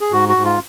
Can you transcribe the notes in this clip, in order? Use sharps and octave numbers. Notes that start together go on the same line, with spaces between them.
G#4
G#2 F#4
F#4
G#2
F4